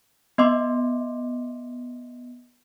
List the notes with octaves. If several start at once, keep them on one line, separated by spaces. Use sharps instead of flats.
B3 D#5 E5 C6 D6